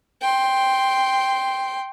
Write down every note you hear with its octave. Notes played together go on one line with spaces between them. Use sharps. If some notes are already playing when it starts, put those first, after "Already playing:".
G5 C6